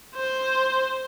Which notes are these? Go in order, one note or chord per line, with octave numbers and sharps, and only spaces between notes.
C5